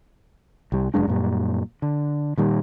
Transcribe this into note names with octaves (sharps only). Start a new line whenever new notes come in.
C2 G3
F1 F#2 G#3 D4
F#2 A#2 G3
D3
A#2 D#3 G3